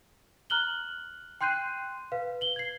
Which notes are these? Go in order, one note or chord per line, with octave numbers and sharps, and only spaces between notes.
A#5 F6 F#6 F#7 G7
G5 C6 F#6 G6 C7 D#7
B4 F5
F#7 G7
G#6 C7